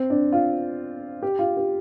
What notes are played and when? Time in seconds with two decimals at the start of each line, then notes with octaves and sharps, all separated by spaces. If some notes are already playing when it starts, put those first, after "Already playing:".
Already playing: C4
0.10 D4
0.32 F4
1.23 G4
1.39 F4
1.57 G4